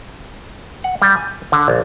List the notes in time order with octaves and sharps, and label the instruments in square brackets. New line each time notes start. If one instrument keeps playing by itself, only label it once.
[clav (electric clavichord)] F#5
G3
G#5
D3
A#1